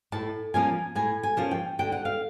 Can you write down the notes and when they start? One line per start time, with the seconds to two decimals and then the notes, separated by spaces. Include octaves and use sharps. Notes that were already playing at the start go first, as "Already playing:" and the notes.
0.12 A2 A5
0.54 F3 A#3 C#4 F4 G#5
0.95 A2 G#5
1.23 G#5
1.37 F3 A#3 C#4 F4
1.51 G5
1.79 D3 G5
1.92 F#5
2.05 F5